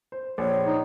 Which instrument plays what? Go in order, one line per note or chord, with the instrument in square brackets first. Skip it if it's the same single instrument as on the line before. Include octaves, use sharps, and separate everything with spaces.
[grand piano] C5
[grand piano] A#1 [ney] C#5
[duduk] D#4